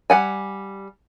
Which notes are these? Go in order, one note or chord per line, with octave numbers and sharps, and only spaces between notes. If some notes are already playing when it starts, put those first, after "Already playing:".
G3 F#5 G#5